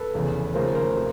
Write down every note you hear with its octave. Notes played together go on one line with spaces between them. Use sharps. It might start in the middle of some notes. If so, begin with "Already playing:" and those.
Already playing: A4 B4
F1 E2 C#3
D#2 C#3 F3 A3 A#4 C5
A#4 C5
C3